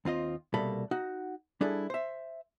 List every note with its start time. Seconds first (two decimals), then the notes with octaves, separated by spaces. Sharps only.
0.05 D#2 C4 F4 D#5
0.54 C2 B2 G3 A#3 A4 B5
0.91 D#4 F#4 F#5
1.61 G3 D4 E4 G#4 A4
1.90 C5 E5